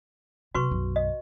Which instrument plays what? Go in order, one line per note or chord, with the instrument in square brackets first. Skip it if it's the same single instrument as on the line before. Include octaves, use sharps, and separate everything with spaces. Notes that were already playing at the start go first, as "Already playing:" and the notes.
[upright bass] C3 F#3 [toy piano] F#4 B4 C#6
[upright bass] B1 F#2
[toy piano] D#5